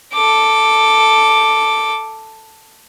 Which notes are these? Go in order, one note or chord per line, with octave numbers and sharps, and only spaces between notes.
A4 D6